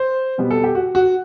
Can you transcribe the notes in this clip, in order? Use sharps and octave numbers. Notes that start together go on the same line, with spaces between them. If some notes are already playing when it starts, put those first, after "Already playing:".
Already playing: C5
B2 G3 B3
A4
G4
F#4
F#4